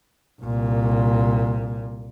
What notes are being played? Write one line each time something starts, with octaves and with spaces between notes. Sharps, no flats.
C2 A#2